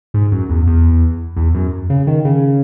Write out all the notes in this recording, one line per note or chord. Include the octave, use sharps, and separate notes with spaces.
G#2
F#2
E2
E2
E2
F#2
C#3
D#3
C#3